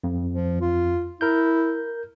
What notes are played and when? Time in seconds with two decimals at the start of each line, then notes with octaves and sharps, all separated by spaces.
0.04 F2
0.32 F3
0.61 F4
1.21 E4 A#4 G6